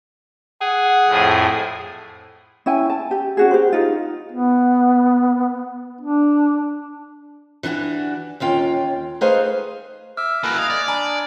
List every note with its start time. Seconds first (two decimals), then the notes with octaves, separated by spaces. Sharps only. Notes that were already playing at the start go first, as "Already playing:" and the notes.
0.61 G#4 F#5
1.08 F2 A2
2.66 C#4 E4 G5 G#5
2.90 A5
3.11 G4
3.37 C#4 F#4 G#4
3.51 G4 C5
3.73 D#4 F4
4.32 B3
6.01 D4
7.63 E3 D4 D#4 F#4 G4
8.40 D#2 C#4 F4 G5
9.21 A3 D#4 G#4 B4 C5 F5
10.17 E5 D6 F6
10.43 A#3 E4 F#4 A4 B4 G#5 D7
10.58 D#5 F5 G#6
10.70 D5
10.88 D4 G#5 A#5 B5